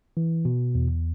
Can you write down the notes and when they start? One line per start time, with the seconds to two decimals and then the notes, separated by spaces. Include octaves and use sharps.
0.17 E3
0.45 B2
0.75 E2